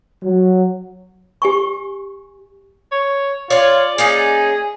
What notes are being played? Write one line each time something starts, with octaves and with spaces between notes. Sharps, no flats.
F#3
G4 G#5 C#6
C#5
F4 C#5 D5 F5
A#3 C#4 D#4 G#4